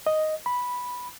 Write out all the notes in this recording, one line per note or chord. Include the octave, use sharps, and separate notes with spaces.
D#5
B5